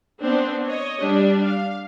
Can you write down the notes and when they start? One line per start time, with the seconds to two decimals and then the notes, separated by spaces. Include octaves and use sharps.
0.20 B3 C4 D4
0.66 C#5 D#5
1.00 G3 D4
1.43 F5